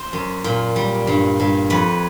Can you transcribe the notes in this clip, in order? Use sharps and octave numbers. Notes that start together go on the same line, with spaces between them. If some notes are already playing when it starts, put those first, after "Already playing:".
Already playing: C5
F#2
A#2
G3
G2
G2
F2 B4